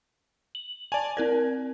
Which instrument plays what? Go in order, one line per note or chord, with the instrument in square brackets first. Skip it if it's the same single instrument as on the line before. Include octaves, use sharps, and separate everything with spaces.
[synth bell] F#7
[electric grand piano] D5 G#5 [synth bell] A5
[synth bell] C4 A#4 D5 [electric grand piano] G#6